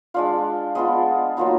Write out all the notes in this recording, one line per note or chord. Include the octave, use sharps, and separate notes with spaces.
G#3 D4 F4 F5
G#3 B3 D4 F4 D#5
F#3 A#3 D#4 F4